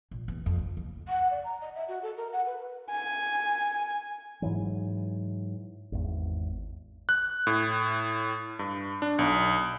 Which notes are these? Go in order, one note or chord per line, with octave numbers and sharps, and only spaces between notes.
A#1
E2
F2
C#2
D#2
F#5
D5
A#5
D#5
E5
F#4
A4
A#4
F#5
B4
G#5
G#2 E3 F#3
G#1 E2
F#6
A2
G2
D4
B1